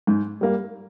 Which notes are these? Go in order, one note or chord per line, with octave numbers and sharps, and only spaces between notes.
G#2
G3 A#3